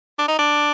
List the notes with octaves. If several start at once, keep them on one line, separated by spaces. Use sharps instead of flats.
D4
D#4
D4